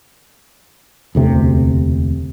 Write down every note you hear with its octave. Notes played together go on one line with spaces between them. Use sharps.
E1 D2 C3